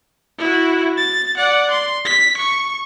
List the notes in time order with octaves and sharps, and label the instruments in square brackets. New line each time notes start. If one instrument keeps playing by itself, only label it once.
[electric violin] E4 F#4
A6
D5 F#5
C6
B6
C#6